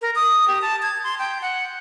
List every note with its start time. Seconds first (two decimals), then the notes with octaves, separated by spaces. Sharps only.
0.02 A#4
0.16 D#6
0.48 G4
0.62 A5
0.82 G#6
1.04 C6
1.19 G5
1.42 F#5